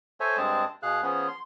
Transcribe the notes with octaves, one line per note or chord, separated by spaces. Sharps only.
A4 C5 C#5 E5 G#5
G2 G#3 C4 G#4 A5
B2 G#4 F5 F#6
F3 B3 C#4 G#4
C6